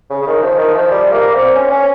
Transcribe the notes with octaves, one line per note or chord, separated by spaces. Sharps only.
C#3
C#3
D#3
F3
D#3
F3
G3
A#3
C4
C#4
C#4